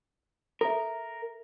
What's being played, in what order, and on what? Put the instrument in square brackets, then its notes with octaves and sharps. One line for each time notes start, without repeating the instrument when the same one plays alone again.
[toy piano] A4 E5 [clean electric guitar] A#4